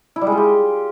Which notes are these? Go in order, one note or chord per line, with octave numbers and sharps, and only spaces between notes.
E4
G3
G#3
F4
G4